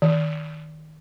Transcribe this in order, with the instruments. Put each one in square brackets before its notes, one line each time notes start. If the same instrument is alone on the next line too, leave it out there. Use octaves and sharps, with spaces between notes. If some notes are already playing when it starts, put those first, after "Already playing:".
[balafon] D#3